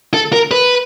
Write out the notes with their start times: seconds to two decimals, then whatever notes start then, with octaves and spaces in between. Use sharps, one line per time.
0.14 A4
0.33 A#4
0.51 B4